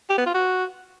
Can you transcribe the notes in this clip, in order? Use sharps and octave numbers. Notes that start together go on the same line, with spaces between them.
G4
B3
F4
F#4